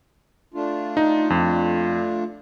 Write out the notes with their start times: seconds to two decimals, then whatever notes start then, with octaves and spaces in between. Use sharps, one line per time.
0.54 A3 D4 F4
0.97 D#4
1.30 F2